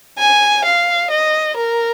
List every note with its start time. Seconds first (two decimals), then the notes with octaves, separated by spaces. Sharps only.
0.19 G#5
0.65 F5
1.11 D#5
1.57 A#4